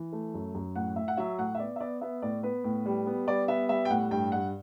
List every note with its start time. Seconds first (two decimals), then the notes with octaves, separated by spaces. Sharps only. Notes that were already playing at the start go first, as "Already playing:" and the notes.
Already playing: E3
0.13 A3
0.34 F#2
0.55 F#2
0.75 A2 F#5
0.96 A2 E5
1.08 F#5
1.17 F#3 E5
1.38 A2 F#5
1.55 E5
1.59 B3 D5
1.76 E5
1.81 B3 D5
2.01 B3 E5
2.22 A2 D5
2.43 B3 B4
2.64 A2
2.86 G3
3.06 B3
3.27 G3 D5
3.48 B3 E5
3.69 G3 E5
3.85 G5
3.90 A2 F#5
4.11 G2 G5
4.32 G2 F#5